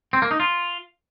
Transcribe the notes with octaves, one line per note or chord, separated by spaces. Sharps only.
C4
A#3
D#4
F4